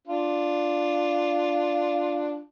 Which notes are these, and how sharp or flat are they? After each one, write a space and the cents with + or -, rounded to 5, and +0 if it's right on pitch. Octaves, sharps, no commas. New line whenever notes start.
D4 +0 F4 +0